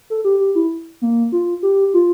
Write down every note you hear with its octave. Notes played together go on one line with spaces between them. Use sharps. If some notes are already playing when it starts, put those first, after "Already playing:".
A4
G4
G4
E4
A#3
F4
G4
F4